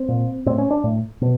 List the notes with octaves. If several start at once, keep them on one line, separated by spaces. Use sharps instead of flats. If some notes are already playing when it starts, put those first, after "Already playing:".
Already playing: C4
A#2
A2 C4
C#4
D4
A2
B2